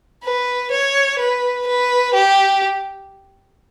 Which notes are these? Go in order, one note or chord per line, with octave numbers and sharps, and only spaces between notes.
B4
C#5
B4
B4
G4